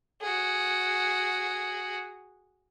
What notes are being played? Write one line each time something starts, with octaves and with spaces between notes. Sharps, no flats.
F#4 G#4